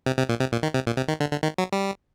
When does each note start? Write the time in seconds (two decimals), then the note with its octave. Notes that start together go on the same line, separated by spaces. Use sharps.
0.06 C3
0.18 C3
0.29 A#2
0.40 C3
0.52 A#2
0.63 D#3
0.74 C3
0.87 A#2
0.97 C3
1.08 D#3
1.20 D3
1.31 D3
1.43 D#3
1.58 F#3
1.73 G3